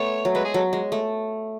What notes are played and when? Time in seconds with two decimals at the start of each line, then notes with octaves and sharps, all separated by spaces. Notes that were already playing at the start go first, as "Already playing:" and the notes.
Already playing: A3 B3 C#5
0.25 F#3
0.35 G#3 B4
0.45 G#4
0.54 F#3 A4
0.73 G#3
0.92 A3